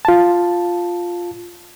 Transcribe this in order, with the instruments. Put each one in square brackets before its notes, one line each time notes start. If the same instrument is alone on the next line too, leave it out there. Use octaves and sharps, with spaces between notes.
[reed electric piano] F4 A5